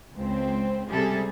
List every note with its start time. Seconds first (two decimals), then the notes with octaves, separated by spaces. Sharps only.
0.17 C#2 C4
0.90 C3 G3 G#4 A4